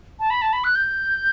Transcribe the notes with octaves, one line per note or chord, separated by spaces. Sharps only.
A5
B5
A5
B5
F#6
G6